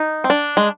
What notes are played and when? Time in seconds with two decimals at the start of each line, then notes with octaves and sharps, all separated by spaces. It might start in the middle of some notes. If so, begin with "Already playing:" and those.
Already playing: D#4
0.24 C4
0.30 D4
0.57 G#3